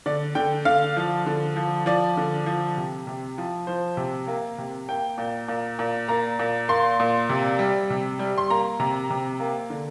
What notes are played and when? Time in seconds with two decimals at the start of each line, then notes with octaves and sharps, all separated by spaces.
0.06 D3 D5
0.35 D3 G5
0.65 D3 F5
0.97 F3
1.26 D3
1.56 F3
1.86 F3 D5
2.17 D3
2.46 F3
2.77 C3
3.07 C3
3.38 F3
3.67 F3 C5
3.97 C3
4.27 A#3
4.58 C3
4.89 A#3 G5
5.18 A#2
5.48 A#2
5.79 A#2
6.09 A#3 A#5
6.39 A#2
6.68 A#3 C6
7.00 A#2
7.29 C3
7.59 G3
7.90 C3
8.19 G3
8.38 C6
8.50 A#3 A#5
8.80 C3 A#5
9.10 C3
9.40 A#3
9.70 D3